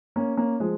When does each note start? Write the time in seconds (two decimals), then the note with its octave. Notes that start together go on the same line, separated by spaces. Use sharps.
0.16 A#3 C#4
0.37 A#3 C#4
0.60 F3 G#3